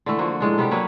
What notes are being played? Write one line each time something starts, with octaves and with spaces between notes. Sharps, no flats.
D3 E3 A3
F3 A#3 F#4
A2 G#3 D4
C3 G3 B3 G4
F#3 A#3 B4 C#5